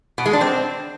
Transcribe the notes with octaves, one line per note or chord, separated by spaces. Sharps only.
B2
G#3
D4
C4